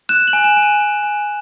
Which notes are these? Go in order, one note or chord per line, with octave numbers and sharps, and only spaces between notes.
F#6 E7
F#7
G#5
E7
G#5
D#7
G#5
G#5